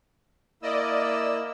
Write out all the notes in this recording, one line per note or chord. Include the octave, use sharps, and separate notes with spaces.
A#3 E4 D5 D#5 E6